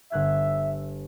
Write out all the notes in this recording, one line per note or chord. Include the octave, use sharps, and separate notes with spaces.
G1 E5 F#6 G#6